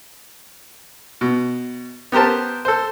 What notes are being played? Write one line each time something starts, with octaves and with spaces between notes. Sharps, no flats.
B2
B3 G4 A#4 C5 A5
A4 C5